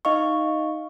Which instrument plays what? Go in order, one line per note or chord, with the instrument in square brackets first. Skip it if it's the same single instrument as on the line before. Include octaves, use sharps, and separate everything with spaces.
[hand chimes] D#4 D#5 F5 C#6